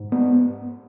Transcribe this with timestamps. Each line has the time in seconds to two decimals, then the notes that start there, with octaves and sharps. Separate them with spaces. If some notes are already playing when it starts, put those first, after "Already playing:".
Already playing: G#2
0.12 B3